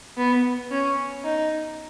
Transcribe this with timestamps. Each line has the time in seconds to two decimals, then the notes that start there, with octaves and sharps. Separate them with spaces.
0.17 B3
0.71 C#4
1.24 D#4